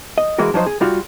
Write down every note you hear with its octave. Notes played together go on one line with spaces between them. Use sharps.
D#5
E3 G#3 A#3 F#4 A#4
F3 F#3 D#4 C5
G#4
G3 F4 F#4